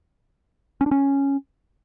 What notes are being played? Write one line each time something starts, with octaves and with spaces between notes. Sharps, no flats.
C#4
D4
C#4